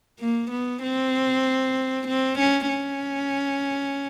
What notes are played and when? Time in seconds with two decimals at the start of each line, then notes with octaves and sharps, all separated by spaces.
0.20 A#3
0.51 B3
0.83 C4
2.07 C4
2.39 C#4
2.69 C#4